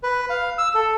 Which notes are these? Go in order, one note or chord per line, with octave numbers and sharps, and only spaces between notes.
B4
F5
E6
A4